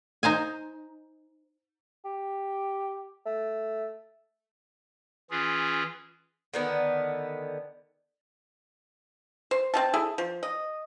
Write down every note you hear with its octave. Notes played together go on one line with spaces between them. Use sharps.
D#4 C5 F5 G#5
G4
A3
E3 C#4 F4 G#4
D3 D#3 B3
C5
C4 F4 A5
E4 G#4 A4
F3
D#5